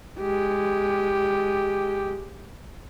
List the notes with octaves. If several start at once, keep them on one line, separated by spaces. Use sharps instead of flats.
G#3 G4